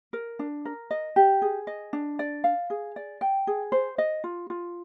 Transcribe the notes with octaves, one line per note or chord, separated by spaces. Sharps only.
A#4
D4
A#4
D#5
G4
G#4
D#5
D4
D5
F5
G#4
D5
G5
G#4
C5
D#5
F4
F4